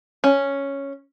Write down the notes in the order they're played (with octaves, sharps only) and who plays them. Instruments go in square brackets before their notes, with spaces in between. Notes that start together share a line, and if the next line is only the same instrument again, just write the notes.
[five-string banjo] C#4